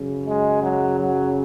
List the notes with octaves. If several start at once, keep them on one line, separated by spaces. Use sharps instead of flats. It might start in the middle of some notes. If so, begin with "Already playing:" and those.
Already playing: F#2 C#3
G#3
F#3
F#3